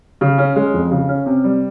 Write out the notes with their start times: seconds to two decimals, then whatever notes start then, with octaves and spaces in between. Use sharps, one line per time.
0.21 C#3
0.38 C#4
0.56 G#3
0.74 F2
0.91 C#3
1.08 C#4
1.26 C3
1.44 G3